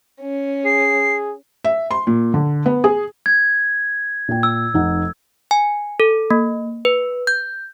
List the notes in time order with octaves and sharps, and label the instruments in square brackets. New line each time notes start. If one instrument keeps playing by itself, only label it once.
[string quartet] C#4
[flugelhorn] G#4 [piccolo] C7
[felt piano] E5
C6
A#2
D3
B3
G#4
[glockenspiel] G#6
[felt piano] A#2 G5
[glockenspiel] E6
[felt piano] F1 D#4 F#5
[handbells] G#5
A4
A#3
B4
G6